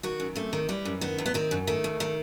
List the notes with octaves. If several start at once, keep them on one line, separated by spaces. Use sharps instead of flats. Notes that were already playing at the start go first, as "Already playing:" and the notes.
D#3 F#4
F#2
C3 A3
D#3
E3 G3
F#2
D#3 B3
E2
B3
D#3 C4
F#2
D#3 A3
D#2
D#3